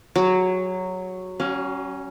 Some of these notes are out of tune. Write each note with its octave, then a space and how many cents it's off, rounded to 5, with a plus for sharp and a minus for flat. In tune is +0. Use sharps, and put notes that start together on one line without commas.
F#3 +0 G#4 -30
F#3 +45 C#4 +0 F5 +30